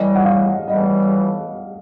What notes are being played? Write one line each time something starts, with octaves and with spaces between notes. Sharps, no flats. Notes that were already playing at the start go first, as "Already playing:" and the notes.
Already playing: A2 E3 G3 D#5
F#5
F5
A2 E3 G3 D#5